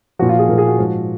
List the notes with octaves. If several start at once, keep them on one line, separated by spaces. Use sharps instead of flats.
A#2 F3 F#4
F4
G#4
A#2 F3 A#4
G#4
F#4
G#2 F3